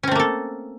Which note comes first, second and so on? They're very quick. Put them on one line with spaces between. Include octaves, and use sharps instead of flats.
C#4 C4 A3 A#3 A4